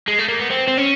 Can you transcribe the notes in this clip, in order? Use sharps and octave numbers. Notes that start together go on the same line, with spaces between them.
G#3
A3
A#3
B3
C4
C4
C#4